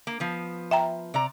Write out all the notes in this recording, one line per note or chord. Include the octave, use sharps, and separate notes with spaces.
A#3
F3 B3
E5 G5 A#5
C3 D5 A#5